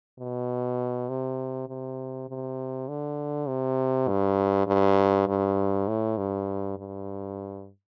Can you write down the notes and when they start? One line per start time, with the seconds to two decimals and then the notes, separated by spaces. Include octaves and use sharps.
0.19 B2
1.09 C3
1.69 C3
2.29 C3
2.88 D3
3.48 C3
4.08 G2
4.67 G2
5.28 G2
5.88 A2
6.18 G2
6.78 G2